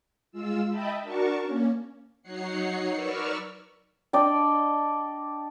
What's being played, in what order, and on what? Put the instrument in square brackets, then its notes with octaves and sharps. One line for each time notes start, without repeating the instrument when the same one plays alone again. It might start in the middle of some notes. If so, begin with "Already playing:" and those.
[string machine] G#3 F4 E6
D#5 E5 G5 A5 B5
D4 F#4 A#4 A5 C#6
A#3 C#4
F#3 D#4 C#5 F#5 C7 C#7
A#4 B4 D5 C#6 E6 F6
[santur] D4 D5 D#5 G5